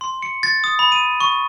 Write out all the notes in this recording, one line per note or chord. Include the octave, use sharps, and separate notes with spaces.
C6
C#7
A6
D#6
B5
D#7
C#6